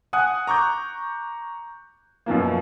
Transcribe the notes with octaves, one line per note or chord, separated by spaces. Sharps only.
F#5 G#5 D#6 F#6
A#5 C#6 D6 G6
F#2 B2 F3 A#3